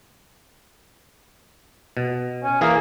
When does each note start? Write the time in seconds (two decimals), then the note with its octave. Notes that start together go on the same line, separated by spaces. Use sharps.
1.97 B2
2.43 C#4
2.61 E3 A#3 G#4 F5